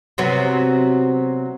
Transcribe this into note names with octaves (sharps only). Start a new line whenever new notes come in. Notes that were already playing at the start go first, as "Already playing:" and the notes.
C3 F#3 B3